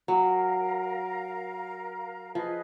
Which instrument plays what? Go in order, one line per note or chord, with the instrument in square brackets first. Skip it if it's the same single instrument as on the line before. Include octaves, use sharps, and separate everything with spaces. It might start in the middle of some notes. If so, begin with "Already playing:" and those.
[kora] F#3 [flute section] A#4 F5 A#5
[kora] F3 [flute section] G#4 B4 D#5